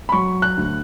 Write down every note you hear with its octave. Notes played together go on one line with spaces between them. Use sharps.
B5
F#3 C#6
F#6
D2